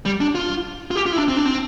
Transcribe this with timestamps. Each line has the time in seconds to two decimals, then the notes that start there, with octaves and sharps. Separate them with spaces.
0.05 G3
0.21 D4
0.35 F4
0.91 F4
0.96 G4
1.06 F4
1.13 E4
1.17 D4
1.28 C4
1.37 D4
1.45 C4